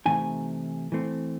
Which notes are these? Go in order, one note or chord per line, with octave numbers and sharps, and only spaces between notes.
C3 E3 A3 D#4 G#5
E3 A3 C4